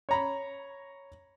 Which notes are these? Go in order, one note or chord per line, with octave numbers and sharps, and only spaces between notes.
C#5 A#5 B5